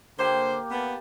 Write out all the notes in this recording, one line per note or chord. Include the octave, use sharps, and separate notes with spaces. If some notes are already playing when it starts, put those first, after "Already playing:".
D3 A#3 G4 C5
B3 F5 A5